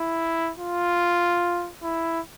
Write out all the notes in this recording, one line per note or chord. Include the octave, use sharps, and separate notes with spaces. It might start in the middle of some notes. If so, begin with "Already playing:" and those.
Already playing: E4
F4
E4